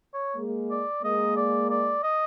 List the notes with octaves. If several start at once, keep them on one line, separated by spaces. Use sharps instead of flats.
C#5
G#3 A#3
D5
G#3 A#3 D#5
D5
D5
D#5